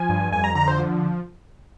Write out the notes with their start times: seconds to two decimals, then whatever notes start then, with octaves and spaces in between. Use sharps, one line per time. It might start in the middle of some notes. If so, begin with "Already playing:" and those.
Already playing: F3 G#5
0.09 G2
0.32 F2 G#5
0.44 A#5
0.55 D3 A#5
0.68 C5
0.79 F3